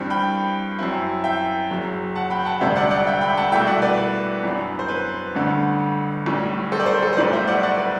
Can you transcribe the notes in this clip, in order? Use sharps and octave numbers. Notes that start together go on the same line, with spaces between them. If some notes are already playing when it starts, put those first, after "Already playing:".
Already playing: G2 E3 G3 C4
G5 B5
F#2 F#3 C4 E4
E5 G5
F#1 F#2 F#3
F#5 A5
G5 B5
F#5 A5
E1 D2 C3 G3 D4 C5 E5
D5 F#5
D5 F#5
E5 G5
G5 B5
F#5 A5
C2 B2 A3 E4 E5 G5
D5 F#5
B4 D5
B4
F#2 E3 B3 D4
C5
B4
A1 G2 D3 A3
B1 A2 G3
A4 C5
D5
A4 C5
A4 C5
C5
B1 A2 G3 B4 D5
C5 E5
D5 F#5
D5 F#5
B4